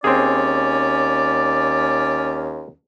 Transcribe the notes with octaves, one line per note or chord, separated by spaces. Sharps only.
D#2 C4 C#4 G#4 D5